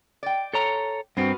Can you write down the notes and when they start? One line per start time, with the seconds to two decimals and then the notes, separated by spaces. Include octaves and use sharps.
0.23 D5 G5
0.53 A4 C#5 A#5
1.17 G2 B3 C4 F#4 A#4